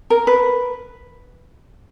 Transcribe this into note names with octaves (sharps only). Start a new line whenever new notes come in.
A#4
B4